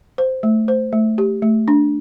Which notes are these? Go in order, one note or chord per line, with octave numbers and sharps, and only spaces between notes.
C5
A3
C5
A3
G4
A3
D4